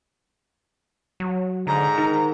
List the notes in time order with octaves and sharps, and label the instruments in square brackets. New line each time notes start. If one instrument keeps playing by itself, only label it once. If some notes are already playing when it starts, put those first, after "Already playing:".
[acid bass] F#3
[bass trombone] G#2 [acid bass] D3 [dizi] A#5
[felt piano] D#3 [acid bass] A#4